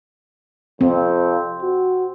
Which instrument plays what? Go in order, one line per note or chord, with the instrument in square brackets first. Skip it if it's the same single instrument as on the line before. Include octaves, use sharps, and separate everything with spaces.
[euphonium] F2 [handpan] C4
[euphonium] F#4